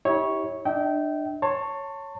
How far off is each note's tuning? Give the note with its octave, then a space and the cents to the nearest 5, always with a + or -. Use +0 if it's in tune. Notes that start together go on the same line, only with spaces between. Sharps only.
E4 -40 G4 +0 C#5 +0
D4 +25 E5 -40 G5 -20
C#5 +0 A5 +25 C6 +20